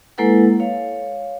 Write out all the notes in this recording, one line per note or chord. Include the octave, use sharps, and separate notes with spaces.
G#3 A#3 E4 A4 B4 F#5
C#5 F5